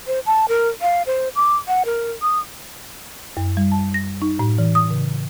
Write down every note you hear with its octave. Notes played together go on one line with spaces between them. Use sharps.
C5
A5
A#4
F5
C5
D6
F#5
A#4
D#6
F#2
G3
A5
A#6
D#4
A2
E3
D#6
C#3